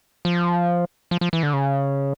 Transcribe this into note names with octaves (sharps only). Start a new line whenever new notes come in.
F3
F3
F3
E3
D3
C#3